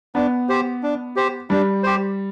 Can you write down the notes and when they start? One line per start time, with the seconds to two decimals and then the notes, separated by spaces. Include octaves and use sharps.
0.15 B3 D4
0.49 G4 C5
0.83 D4
1.16 G4 C5
1.50 G3 D4
1.83 G4 C5